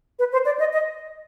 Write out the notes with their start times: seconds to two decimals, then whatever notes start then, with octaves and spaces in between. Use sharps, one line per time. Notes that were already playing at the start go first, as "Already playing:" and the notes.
0.19 B4
0.33 C5
0.45 D5
0.59 D#5
0.73 D#5